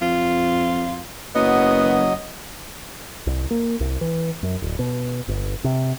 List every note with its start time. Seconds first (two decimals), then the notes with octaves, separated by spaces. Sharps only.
0.02 F2 F4
1.35 F#1 F#3 B3 D#5
3.27 C2
3.51 A#3
3.80 C2
4.01 E3
4.43 F#2
4.62 D1
4.79 B2
5.28 G1
5.64 C3